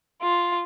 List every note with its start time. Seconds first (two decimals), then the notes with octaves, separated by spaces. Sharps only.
0.22 F4